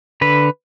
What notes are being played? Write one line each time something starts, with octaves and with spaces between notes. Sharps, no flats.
D3 B4